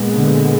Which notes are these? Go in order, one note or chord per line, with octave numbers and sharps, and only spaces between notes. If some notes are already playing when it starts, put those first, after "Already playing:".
Already playing: A#2 G#3 B3
D3